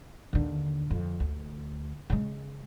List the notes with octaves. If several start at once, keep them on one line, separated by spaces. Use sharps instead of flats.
D#2 D3
F2
D2
C#3 G#3